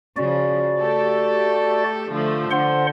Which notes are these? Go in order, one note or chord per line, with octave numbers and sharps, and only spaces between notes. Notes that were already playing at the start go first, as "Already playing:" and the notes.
C#3 F3 F#4 D5
A3 G4 A4
D3 F3 A3
D3 C5 F#5 C6